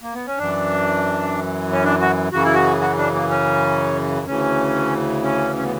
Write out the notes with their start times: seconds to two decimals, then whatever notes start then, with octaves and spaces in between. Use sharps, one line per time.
0.02 A#3
0.14 B3
0.27 C#4
0.38 F#2 E3 D4
1.72 C#4
1.84 D4
2.00 F#4
2.32 F#2 C#3 E3 F#4
2.44 E4
2.54 F#4
2.81 F#4
2.98 D4
3.14 A#3
3.30 C#4
4.26 D2 C#3 E3 C#4
5.23 C#4
5.56 C#4
5.64 B3